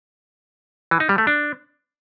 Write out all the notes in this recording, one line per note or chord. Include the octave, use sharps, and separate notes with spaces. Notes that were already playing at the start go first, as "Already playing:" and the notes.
E3
D#4
G3
A3
D4